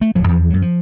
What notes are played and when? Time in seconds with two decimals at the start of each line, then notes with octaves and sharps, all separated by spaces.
0.01 A3
0.15 D1 F3 F#3
0.28 E2 F3
0.50 F#2 F#3
0.62 F3